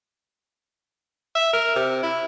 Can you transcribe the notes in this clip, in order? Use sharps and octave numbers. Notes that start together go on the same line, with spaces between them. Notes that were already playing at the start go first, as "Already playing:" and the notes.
E5
A#4
C3
E4